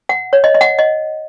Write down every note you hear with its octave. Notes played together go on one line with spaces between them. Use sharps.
F#5
C#5
D#5
D#5
F#5
D#5